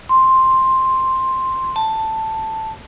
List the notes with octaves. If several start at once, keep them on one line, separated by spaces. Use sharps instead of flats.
C6
A5